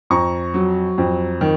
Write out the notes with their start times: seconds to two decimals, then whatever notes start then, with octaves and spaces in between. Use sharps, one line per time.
0.10 F2 A#5 C#6
0.54 F#3
0.98 F2
1.41 D#3